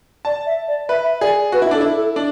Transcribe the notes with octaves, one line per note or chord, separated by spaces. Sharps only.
D5 A5
E5
D5
B4 E5
E5
G#4 D5
F#4 B4
E4
D4 A4
E4
A4
D4